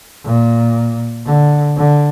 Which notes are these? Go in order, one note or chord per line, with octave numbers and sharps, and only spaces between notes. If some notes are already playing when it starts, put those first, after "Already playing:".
A#2
D3
D3